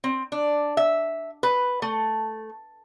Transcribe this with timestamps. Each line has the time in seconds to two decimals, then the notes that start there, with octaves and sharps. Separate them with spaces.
0.04 C4
0.32 D4
0.77 E5
1.43 B4
1.82 A3